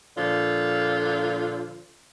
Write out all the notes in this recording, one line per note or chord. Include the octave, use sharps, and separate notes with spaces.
A#2 D3 F3 F4